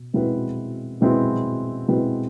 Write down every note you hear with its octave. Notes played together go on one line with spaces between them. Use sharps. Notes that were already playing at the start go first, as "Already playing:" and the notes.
Already playing: B2
B2 G#3 C4 E4 B4
B2 G#3 C4 E4 B4
B2 G#3 C4 E4 B4